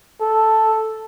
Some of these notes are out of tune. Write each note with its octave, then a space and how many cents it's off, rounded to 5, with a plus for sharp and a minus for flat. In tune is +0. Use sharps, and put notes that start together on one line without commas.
A4 +0